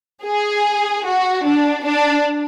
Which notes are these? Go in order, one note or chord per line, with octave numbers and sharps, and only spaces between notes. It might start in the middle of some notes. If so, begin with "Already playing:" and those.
G#4
F#4
D4
D4